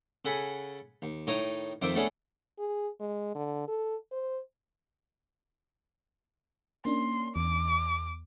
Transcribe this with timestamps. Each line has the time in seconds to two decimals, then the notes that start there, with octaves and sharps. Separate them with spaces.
0.25 C#3 A4 F#5 G#5 B5
1.02 D#2
1.27 A2 D#3 C#5 A#5 D#6
1.82 F2 D#3 C5 E5 D6
1.95 A3 B3 C#4 D4 G#4 A4
2.59 G#4
3.00 G#3
3.35 D3
3.68 A4
4.12 C5
6.85 A#3 C#4 D4 C6
7.36 E2 D6